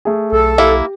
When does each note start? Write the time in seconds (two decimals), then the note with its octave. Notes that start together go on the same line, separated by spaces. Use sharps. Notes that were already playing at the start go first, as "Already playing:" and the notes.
0.05 A3 G#4
0.32 B1 A4
0.58 A#3 E4 G4